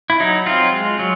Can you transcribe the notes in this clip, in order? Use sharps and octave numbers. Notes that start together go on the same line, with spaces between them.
E4
F#3 D#4
C4 F4
G#3
F#3